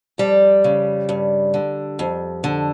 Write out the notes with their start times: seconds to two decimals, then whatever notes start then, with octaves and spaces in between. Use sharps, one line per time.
0.18 F2 G3
0.64 C#3
1.09 G2
1.54 D3
1.99 F2
2.44 D3